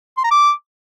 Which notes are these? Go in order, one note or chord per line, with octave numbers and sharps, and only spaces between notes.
C6
A#5
D6